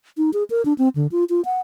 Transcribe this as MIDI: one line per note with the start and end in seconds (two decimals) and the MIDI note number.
0.17 0.30 63
0.33 0.44 68
0.50 0.64 70
0.65 0.73 62
0.78 0.89 60
0.95 1.07 50
1.12 1.24 65
1.29 1.41 65
1.45 1.60 78